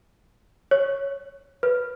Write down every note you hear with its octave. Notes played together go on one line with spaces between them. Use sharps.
C#5
B4